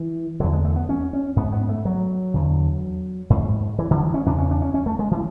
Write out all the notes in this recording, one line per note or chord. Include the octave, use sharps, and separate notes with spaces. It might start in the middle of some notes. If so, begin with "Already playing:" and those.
Already playing: E3
E2 D3 F#3
G#3
A3
B3
C#4
C#4
G#2 B3
B3
A3
F#3
E2 D3
G#2
E3
D3
E3
C#4
E2 C#3 D4
C#4
D4
C#4
C#4
A3
G#3
E3